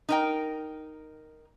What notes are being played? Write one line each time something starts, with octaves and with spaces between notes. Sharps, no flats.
D#4 A#4 G5